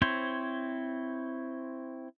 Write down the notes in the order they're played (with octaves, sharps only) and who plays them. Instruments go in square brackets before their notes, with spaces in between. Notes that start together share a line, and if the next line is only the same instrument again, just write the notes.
[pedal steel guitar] C4 E4 C5 C#5